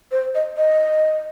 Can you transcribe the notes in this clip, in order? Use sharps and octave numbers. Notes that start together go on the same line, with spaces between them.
C5
D#5
D#5